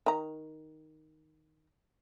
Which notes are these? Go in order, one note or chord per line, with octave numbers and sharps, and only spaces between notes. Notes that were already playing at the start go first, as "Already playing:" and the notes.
D#3 A#5